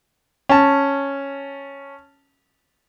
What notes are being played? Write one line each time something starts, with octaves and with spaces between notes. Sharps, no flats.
C#4 A5